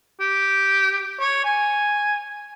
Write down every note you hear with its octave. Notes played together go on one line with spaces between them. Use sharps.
G4
C#5
G#5